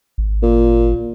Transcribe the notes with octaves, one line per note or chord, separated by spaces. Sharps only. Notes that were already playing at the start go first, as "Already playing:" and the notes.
G#1
A#2